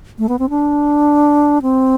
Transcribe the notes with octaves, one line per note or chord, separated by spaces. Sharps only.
A3
B3
C4
D4
C4